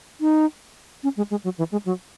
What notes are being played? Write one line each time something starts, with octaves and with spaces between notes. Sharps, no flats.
D#4
C#4
G#3
G#3
F#3
E3
G#3
F#3